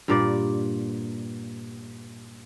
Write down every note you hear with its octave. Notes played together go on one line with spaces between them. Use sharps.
G2 A#2 D5